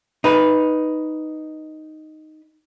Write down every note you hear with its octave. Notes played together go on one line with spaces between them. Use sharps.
D#4 B4